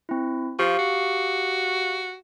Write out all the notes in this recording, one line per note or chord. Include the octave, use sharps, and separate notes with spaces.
C4 E4
F3 G4 F5 C#6
F#4